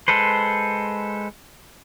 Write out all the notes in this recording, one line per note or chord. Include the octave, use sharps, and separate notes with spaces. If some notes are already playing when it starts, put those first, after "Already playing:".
G#3 A4 B4 C5